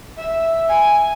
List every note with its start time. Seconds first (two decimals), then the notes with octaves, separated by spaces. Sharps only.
0.18 E5
0.69 G#5